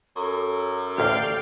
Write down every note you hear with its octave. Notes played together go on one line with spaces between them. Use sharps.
F#2 A4
A1 D2 D5 F5 G5